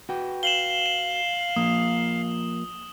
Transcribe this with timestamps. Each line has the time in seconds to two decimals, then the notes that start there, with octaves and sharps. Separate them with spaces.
0.09 F#4 B4 G5
0.43 F5 E7 F#7 G7
0.86 E7
1.56 F3 A#3 D#6